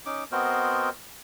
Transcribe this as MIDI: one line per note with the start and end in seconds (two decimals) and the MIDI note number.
0.06 0.24 61
0.06 0.24 63
0.06 0.24 86
0.32 0.90 59
0.32 0.90 60
0.32 0.90 66
0.32 0.90 70
0.32 0.90 72
0.32 0.90 75